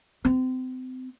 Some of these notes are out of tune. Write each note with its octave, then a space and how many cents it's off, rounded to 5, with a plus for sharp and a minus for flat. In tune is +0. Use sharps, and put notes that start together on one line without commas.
C4 -30